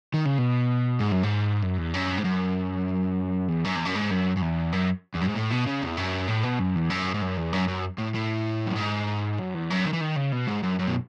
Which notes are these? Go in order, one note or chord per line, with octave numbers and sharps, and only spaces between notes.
D#3
C#3
B2
G#2
F#2
G#2
F#2
E2
F#2
G#2
F#2
E2
F#2
E2
F#2
G#2
F#2
F#2
E2
F#2
E2
F#2
G#2
A2
B2
C#3
E2
F#2
A2
B2
F#2
E2
F#2
G#2
F#2
E2
F#2
F#2
A2
A2
F#2
G#2
F#2
E2
F#2
D#3
E3
D#3
C#3
B2
G#2
F#2
F#2
B2